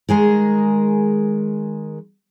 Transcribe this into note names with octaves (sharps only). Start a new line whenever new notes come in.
D#3 G#3 G#4 A#4